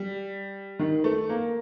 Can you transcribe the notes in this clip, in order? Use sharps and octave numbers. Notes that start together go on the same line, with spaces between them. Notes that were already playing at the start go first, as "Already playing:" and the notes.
Already playing: G3
D#3
A3
A#3